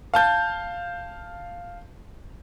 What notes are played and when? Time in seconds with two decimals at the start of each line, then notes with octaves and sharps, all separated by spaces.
0.14 F5 A5 G6